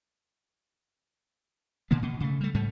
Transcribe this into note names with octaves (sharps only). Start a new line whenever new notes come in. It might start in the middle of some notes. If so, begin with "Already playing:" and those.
A#2 D3 A#3 B3
B2
C#3 A3
G3 A3
G#2 G3 A3